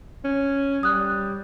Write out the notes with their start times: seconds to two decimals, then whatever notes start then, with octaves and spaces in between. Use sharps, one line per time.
0.25 C#4
0.83 G3 D#6 F#6